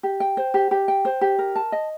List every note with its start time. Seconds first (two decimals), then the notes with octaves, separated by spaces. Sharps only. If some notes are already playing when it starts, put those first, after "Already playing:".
0.03 G4
0.20 G5
0.37 C5
0.54 G4
0.71 G4
0.88 G5
1.05 C5
1.21 G4
1.39 A#4
1.56 A5
1.72 D#5